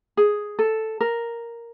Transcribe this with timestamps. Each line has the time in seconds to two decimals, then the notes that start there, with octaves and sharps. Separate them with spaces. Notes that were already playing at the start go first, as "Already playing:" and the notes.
0.17 G#4
0.59 A4
1.01 A#4